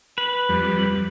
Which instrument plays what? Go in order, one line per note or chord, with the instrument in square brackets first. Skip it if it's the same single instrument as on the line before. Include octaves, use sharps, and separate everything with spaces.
[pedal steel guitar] B4
[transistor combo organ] F2 G3